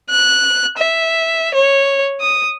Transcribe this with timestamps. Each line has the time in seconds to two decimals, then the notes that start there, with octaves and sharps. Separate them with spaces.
0.10 F#6
0.78 E5
1.54 C#5
2.20 D#6